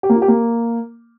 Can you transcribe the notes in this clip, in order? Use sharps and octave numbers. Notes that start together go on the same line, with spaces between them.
G4
A#3
F4
G4
A#3